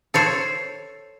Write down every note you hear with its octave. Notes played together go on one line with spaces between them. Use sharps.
A4 C5 C#5